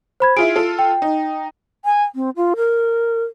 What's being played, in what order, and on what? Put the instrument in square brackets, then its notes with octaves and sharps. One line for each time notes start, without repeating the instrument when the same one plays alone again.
[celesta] C5 B5 G#6
[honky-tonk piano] E4 F4 G#4 [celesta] D7
[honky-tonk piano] F4 A4
[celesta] G5
[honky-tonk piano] D#4
[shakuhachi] G#5
C4
F4
A#4